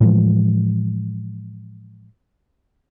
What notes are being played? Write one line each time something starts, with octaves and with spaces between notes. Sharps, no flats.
A2 E3 F3 G#3